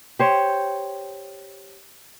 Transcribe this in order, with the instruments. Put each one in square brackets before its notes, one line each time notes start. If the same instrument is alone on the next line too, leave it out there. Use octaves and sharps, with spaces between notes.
[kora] G4 C5 C#5